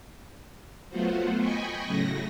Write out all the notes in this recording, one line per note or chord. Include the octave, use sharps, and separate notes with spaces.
F#3 A3 B3 F4 F#4 C5
D#5 G5 G#5 B5 C#6
A2 C#3 F#3 A3 A#6